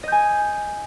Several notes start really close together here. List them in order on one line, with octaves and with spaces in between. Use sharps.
D#5 G6 G#5